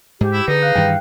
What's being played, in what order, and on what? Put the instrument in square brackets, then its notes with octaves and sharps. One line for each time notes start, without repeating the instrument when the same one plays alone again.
[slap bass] G#2 [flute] G4
[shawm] E4
[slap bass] D3 [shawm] D#4 [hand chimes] G#4 B4
[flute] F5 [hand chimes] F#6
[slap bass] G2 D#3 E3 [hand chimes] G5